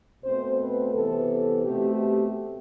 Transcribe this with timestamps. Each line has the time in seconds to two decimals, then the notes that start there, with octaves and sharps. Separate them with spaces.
0.24 B2 A3 C4 C5
0.59 B4
0.94 C3 E3 B3 A4
1.64 B2 A3 C4 G4
2.00 G4